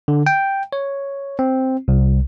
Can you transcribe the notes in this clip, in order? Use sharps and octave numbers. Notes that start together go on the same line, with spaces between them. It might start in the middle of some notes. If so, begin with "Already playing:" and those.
D3
G5
C#5
C4
C2